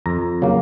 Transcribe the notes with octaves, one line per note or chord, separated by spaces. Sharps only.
F2 A#5
C#3 F#3 A#3